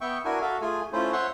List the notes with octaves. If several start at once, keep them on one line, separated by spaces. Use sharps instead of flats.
B3 E5 G5 C#6
D4 E4 F#4 A#4 G#5
F#4 A4 E5 F5
A3 F4 G#4 G#5
A3 C#4 E4 F4 C5
C5 C#5 E5 F#5 C6 C#6